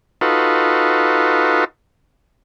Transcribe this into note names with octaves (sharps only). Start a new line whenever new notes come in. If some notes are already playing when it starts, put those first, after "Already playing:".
D#4 F4 F#4 A4 B4